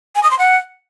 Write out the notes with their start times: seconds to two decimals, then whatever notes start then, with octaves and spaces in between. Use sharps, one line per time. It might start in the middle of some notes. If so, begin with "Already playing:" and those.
0.15 G#5
0.23 D#6
0.31 C6
0.39 F#5